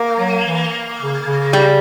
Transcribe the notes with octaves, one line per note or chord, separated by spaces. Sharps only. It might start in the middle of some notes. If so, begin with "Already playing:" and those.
Already playing: A#3
F#3
E3
C#3
C#3
G3